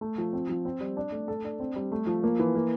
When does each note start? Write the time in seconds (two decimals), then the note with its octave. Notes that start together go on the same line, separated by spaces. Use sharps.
0.01 A3
0.18 F3
0.33 C4
0.49 F3
0.65 C4
0.80 G3
0.97 D4
1.12 A3
1.28 A4
1.44 D4
1.60 C4
1.76 G3
1.92 A3
2.07 F3
2.24 A#3
2.39 E3
2.55 A#3